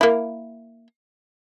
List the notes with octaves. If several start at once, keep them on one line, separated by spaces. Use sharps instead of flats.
A#3 E4